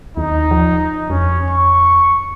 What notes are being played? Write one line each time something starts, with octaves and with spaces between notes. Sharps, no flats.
D#2 D#4
F3
F2 C#4
C#6